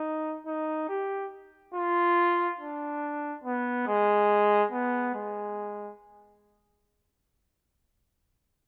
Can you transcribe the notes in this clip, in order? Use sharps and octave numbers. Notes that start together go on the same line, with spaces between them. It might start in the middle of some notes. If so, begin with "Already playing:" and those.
Already playing: D#4
D#4
G4
F4
D4
B3
G#3
B3
G#3